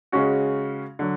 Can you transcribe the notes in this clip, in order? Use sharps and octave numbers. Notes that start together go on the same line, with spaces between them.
C#3 G#3 C#4 F#4
D3 F#3